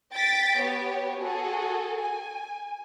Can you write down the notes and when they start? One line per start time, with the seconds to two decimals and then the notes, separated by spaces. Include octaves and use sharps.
0.15 G5 A6 B6 D7
0.59 B3 G4 C#5
1.20 F#4 G#4 A4
2.00 G#5